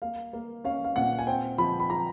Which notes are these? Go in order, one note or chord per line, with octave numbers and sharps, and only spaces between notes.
A#3 F5
A#3
C#4 F5
F5
A#2 F#5
G#5
C4 G5
F3 B5
B5
F3 A#5